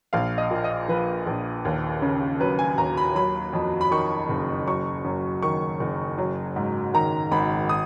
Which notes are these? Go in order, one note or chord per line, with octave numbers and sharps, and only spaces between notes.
A#1 F5
D#5
A#2
D#5
F3 B4
A#1
D#2
C#3
F#3 B4
G#5
D#2 A#5
B5
F#3 B5
F2
B5
D#3 C#6
F#1
F#3 C#6
F#2
D#3 C#6
F#1
F#3
G#2
D#3 A#5
G#1 B5
D#6